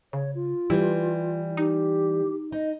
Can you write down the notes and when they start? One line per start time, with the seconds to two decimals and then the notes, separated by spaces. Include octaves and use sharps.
0.13 C#3 C#5
0.35 F4
0.70 E3 G3 E4
1.57 D#4 G4
2.52 D#4 D#5